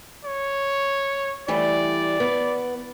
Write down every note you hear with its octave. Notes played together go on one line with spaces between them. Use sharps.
C#5
E3 G3 A3 D5
B3